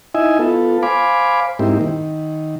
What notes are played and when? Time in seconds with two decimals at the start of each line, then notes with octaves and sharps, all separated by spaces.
0.15 D#4 E4 D#5 E5 G#5
0.39 B3 F4 A4
0.83 C5 F5 G#5 B5 D6
1.59 G#2 A#3 C4 D#4 E4 G4
1.81 D#3